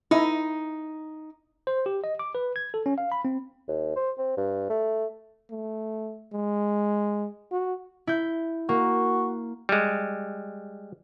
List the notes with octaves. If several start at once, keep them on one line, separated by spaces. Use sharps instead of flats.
D#4 E4
C5
G4
D#5
D6
B4
G#6
A4
C#4
F5
B5
C4
D#2
C5
C4
G2
A3
A3
G#3
F#4
E4 G6
A#3 F#4
G3 G#3